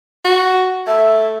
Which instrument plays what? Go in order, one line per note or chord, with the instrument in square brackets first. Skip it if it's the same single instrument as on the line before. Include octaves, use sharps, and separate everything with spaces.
[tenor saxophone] F#4
[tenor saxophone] A3 [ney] E5